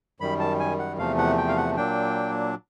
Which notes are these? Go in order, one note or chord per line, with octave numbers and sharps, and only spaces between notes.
F#2 D#3 G3 B5
A5
G#5
F#5
E2 C3 F3 A3 F5
F#5
G5
F5
F#5
A#2 F#3 A#3 D4 G5